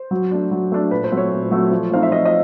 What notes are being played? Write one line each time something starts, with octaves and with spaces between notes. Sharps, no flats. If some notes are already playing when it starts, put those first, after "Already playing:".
Already playing: C5
F#3
A3 D4
F#3
A3 D4
A#2 B4
C5
F#3 A3 C4
C#5
A#2
F#3 A3 C4
F3
A3 C4 D#4 F5
E5
F3 D#5
D#5